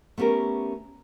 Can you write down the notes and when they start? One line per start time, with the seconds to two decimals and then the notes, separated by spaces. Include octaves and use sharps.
0.18 A3 B3 C#4 G4 A#4